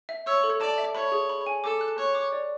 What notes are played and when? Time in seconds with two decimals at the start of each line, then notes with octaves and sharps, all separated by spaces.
0.09 E5
0.27 C#5 E6
0.44 A4
0.61 D5 A5
0.78 E5
0.95 C#5 B5
1.12 G#4
1.30 B5
1.47 G#5
1.64 A4 D6
1.81 F#6
1.98 C#5 F#6
2.15 D6
2.32 D5